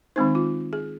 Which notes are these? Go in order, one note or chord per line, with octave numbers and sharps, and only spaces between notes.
D#3 G#3 C4 D#4 C5
F4
G#4